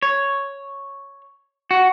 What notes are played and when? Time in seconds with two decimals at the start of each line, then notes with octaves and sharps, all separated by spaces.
0.02 C#5
1.71 F#4